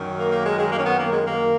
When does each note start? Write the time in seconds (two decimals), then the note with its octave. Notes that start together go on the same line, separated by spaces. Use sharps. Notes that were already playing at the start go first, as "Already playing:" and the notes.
Already playing: F#2 D#3 F#3
0.17 A#3
0.30 A#3
0.44 G#3
0.57 G#3
0.71 A#3
0.77 C#4
0.84 B3
0.97 A#3
1.11 G#3
1.25 A#3